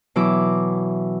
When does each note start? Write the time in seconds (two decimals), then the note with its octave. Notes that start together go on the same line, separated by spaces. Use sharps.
0.16 B2 E3 F#3 E4 E5 D6